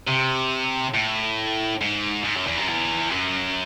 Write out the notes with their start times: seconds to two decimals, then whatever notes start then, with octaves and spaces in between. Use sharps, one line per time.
0.07 C3
0.94 A2
1.81 G#2
2.24 G#2
2.35 F#2
2.46 E2
2.57 F#2
2.68 E2
3.11 F#2